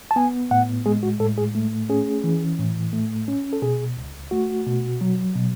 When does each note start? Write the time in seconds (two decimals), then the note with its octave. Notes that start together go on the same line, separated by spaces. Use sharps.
0.11 A5
0.16 B3 G#5
0.51 A2 F#5
0.86 G#3 G#4
1.03 F#4
1.20 A2 A4
1.38 G#4
1.55 A3
1.89 C#4 G#4
2.24 E3
2.59 A2
2.93 A3
3.28 C#4
3.53 A4
3.62 B2 G#4
3.97 C#2
4.31 A3 F#4
4.66 B2
5.01 F#3
5.36 B2